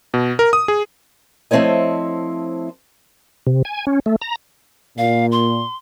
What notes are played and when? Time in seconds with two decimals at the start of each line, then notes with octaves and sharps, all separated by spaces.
0.14 B2
0.39 A#4
0.53 D#6
0.68 G#4
1.51 F3 A3 C4 E4 C#5 D#5
3.47 C3
3.65 G#5
3.87 C#4
4.06 A3
4.21 A#5
4.98 A#2 F5
5.32 C6